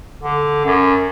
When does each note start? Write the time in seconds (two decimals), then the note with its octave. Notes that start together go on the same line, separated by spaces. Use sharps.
0.23 D3
0.65 F#2